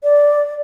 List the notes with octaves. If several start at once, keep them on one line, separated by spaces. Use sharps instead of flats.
D5